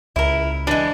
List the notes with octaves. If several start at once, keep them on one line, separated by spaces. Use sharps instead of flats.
C#2 E4 A#4
E3 G#3 D4